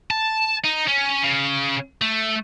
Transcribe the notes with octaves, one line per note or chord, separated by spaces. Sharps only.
A5
D#4
C#4
C#3
A3